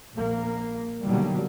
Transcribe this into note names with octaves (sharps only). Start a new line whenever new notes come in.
A#1 A#3
B2 D3 D#3 F#3 G3 A#3